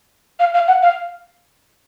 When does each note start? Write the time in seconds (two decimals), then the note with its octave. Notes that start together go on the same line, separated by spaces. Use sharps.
0.40 F5
0.54 F5
0.68 F#5
0.82 F5